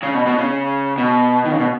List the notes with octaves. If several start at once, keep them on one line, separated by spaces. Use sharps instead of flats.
C#3
B2
B2
C#3
B2
D#3
C#3
B2